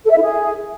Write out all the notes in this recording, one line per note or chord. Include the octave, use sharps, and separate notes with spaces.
A4
E5
E4
G#4